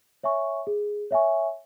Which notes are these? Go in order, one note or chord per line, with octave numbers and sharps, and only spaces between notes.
C#5 E5 G#5 C#6
G#4
C#5 E5 G#5 C#6